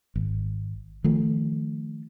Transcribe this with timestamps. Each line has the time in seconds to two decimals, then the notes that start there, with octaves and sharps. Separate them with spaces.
0.16 G#1
1.04 D#3 F3 A3